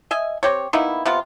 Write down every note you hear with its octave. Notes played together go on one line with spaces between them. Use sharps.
D#5 E5 G#5
C4 G4 C#5
A#3 B3 D#4 E4
C3 B3 F4